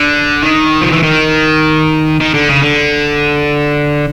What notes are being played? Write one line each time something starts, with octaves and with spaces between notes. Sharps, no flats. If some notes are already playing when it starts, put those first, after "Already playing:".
Already playing: D3
D#3
F3
E3
D#3
D#3
D3
C#3
D3